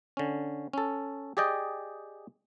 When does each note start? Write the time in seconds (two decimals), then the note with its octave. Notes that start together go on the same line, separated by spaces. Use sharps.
0.17 D3 C#4
0.73 C#4 A4
1.37 G4 G#4 D5 D#5 G5